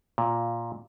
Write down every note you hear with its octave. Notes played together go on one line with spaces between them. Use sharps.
A#2